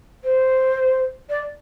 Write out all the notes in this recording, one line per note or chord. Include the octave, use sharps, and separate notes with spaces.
C5
D5